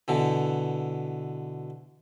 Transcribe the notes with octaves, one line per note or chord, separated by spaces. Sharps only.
B2 D3 E3